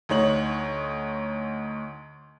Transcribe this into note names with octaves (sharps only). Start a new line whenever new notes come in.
D2 D#4 C#5 F#7